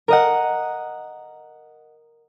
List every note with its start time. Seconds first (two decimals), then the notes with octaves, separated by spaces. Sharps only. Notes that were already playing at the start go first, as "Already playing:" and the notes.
0.08 A#4 D#5 F#5